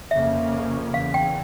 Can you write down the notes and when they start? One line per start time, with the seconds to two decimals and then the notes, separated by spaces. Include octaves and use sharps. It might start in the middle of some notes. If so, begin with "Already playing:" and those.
0.11 F2 C#3 F3 A#3 C#4 E5
0.93 E2 C#3 E3 F5
1.14 G5